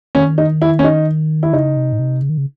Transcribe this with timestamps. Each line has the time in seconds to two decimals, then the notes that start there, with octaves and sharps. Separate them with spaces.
0.15 D#3 C#4
0.38 D#4
0.62 E4
0.79 C#4
0.84 D#4
1.43 E4
1.53 C#3 D#4
1.77 C3
1.93 A2
1.99 C3
2.22 C#3
2.29 D#3
2.38 C#3